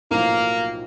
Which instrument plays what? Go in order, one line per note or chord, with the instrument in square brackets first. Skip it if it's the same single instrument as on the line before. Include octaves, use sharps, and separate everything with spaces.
[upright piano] B1 A2 F3 [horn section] A#3